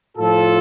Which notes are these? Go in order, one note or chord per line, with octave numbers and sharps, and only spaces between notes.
A2 F3 F4 A4